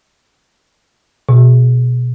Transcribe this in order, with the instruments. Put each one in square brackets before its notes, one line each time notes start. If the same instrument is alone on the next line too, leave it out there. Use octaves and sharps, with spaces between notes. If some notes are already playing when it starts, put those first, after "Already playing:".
[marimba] B2